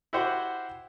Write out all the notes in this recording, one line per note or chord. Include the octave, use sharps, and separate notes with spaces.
E4 F#4 G4 C5 F#5